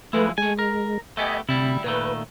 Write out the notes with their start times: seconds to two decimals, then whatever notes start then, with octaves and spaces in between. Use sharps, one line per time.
0.13 F3 G#3 A3 E4 B4
0.38 G#3 A3 G#5
0.59 A#4
1.17 A3 B3 G4 D#5 G#5
1.49 D2 C3 G3 E4
1.84 A#2 D#3 A3 B4